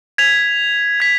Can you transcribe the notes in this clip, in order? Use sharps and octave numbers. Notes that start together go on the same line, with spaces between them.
G#6 B6 F7
G#6 B6